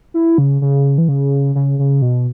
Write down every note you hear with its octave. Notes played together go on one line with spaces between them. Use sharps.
E4
C#3
C#3
E3
C#3
C#3
C#3
B2